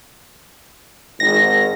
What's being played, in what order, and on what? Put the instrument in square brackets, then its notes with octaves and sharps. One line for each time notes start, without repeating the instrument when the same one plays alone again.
[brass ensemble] G#1 [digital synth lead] A#6